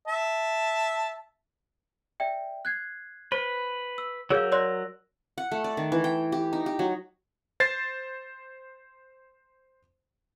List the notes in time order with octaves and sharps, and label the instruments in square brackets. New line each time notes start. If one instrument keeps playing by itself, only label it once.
[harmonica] E5 A5
[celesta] D5 E5 G5
F#6 G#6 C7
[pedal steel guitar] B4 [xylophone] C5
[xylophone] E6
[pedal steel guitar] F#3 A#4 G6 [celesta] G#4 E6 [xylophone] C#5 F5
[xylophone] C#5 D5 C6 [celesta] E6 F#6 A#6
[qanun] F#5
A3
D5
D#3
E3
G5
G4
D#4
G4
F#3
[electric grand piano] C5 A6 C7